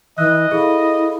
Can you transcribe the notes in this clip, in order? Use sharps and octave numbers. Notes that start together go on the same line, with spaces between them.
E3 D#5 E5 E6 F#6
E4 G#4 A4 F5